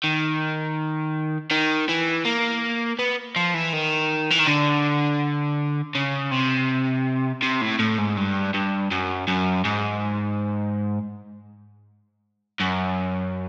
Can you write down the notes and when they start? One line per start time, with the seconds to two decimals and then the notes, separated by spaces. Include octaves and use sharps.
0.04 D#3
1.51 D#3
1.89 E3
2.25 A#3
2.99 B3
3.36 F3
3.54 E3
3.73 D#3
4.31 E3
4.39 D#3
4.48 D3
5.95 C#3
6.31 C3
7.42 C3
7.61 A2
7.79 A2
7.98 G#2
8.17 G2
8.54 G2
8.91 F#2
9.28 F#2
9.65 G#2
12.60 F#2